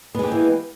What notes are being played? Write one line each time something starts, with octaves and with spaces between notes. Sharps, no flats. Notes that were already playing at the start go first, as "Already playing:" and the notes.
E3 G#3 A#3 B3 G4